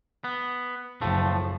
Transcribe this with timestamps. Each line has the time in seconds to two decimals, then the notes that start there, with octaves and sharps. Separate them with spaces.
0.24 B3
1.01 F#1 A2 F3 A3